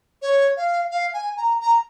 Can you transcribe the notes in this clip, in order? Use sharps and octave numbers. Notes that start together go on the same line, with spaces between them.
C#5
F5
F5
G#5
A#5
A#5